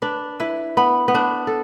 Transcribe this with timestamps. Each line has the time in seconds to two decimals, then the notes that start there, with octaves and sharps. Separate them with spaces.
0.02 D4 B4
0.40 E4 B4
0.77 B3 B5
1.08 B3
1.14 D4 B4
1.47 A4